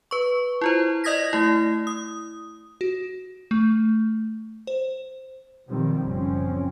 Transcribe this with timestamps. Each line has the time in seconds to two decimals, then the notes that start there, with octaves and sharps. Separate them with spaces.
0.11 B4 C#6
0.61 E4 F4 C5
1.04 D5 D#5 D#6 G#6 A#6 B6
1.33 A3 E4
1.87 D#6
2.81 F#4
3.51 A3
4.67 C5
5.68 B2 D#3 F3 G3 C4
6.02 F#1 A#2 F3 C4 C#4